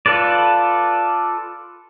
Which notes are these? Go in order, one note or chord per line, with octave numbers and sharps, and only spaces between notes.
F4 A4 B4 D5